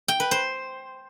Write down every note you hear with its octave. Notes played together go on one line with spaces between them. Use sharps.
G5
B4
C5